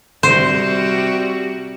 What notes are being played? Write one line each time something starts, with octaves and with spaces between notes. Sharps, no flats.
C3 G3 F#4 C5